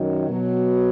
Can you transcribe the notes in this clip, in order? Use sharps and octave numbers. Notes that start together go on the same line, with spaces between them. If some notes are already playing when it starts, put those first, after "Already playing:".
Already playing: F#2 D#3 F#3
B2 F#3